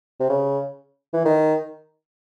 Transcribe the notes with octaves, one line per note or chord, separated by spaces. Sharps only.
C3
C#3
E3
D#3